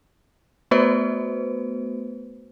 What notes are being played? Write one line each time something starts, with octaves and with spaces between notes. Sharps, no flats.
A3 B3 F#4 B4 C5